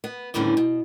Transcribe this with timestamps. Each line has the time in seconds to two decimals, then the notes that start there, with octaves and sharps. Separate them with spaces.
0.04 B3
0.34 D#2 A2 D3 E3 G3 C#4
0.57 B2